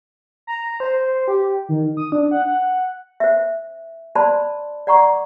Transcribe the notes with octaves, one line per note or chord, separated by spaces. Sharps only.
A#5
C5
G4
D#3
D#6
D4
F#5
F#5
C5 E5
C5 D5 A5 B5 C6
D5 F#5 A#5 C#6 D6